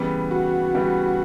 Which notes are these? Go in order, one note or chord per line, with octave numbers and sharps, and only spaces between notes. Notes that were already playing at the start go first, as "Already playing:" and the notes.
Already playing: C#3 E3 G3 B3
F#4
C#3 E3 G3 B3